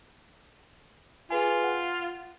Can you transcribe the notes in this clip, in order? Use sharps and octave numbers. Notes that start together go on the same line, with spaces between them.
F4 G#4 B4 G#5
F#5